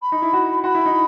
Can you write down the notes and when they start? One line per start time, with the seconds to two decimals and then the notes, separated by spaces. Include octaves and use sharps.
0.02 B5
0.12 D#4
0.22 E4
0.33 F#4
0.63 F#4 B5 C6
0.75 E4
0.86 D#4